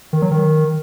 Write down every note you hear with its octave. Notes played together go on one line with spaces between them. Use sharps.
D#3
F#3
D#3